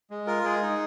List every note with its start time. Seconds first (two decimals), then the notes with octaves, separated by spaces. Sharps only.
0.11 G#3
0.27 F4 A#4
0.44 G#3 G#4
0.62 D#4